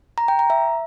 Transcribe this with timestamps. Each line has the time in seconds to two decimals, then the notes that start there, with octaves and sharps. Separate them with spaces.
0.18 A#5
0.28 G5
0.39 A#5
0.50 E5